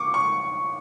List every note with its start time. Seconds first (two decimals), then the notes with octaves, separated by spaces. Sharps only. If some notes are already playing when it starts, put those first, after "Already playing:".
Already playing: C#6 D6
0.14 C#6